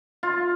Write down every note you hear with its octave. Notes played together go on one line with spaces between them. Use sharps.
F4